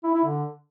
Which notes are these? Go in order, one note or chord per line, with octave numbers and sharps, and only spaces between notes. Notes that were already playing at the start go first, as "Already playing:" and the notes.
E4
E4
D3